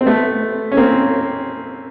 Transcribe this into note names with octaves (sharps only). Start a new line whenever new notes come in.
C4
A3 B3
C#4
A#3 C4